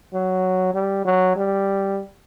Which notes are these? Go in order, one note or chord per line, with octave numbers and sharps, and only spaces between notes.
F#3
G3
F#3
G3